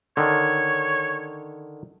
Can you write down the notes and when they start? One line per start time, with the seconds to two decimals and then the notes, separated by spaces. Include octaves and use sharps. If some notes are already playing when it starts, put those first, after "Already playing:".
0.17 D3 D#3 C#5